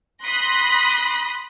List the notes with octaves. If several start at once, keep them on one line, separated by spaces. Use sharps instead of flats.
B5 C6 D#6 F#6 A#6 B6